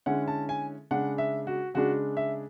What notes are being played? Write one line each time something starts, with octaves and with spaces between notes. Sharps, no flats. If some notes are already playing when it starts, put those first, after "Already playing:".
D3 G#3 C#4 E4 F#5
A5
G#5
C#3 G#3 D4 F#5
E5
F#4
C#3 G#3 D4 F#4
E5